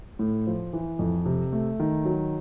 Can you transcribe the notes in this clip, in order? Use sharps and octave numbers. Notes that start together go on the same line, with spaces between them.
A2
F3
E3
F2
C3
A3
D#3
F#3